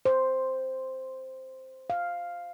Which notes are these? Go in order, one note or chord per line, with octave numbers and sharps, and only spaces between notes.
C5
F5